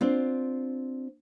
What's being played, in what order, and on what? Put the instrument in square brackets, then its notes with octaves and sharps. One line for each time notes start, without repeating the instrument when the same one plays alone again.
[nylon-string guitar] C4 D4 F4